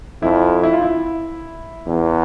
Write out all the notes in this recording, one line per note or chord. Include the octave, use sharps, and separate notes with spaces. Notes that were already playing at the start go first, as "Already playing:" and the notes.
F2 E4
E4
F4
E4
E2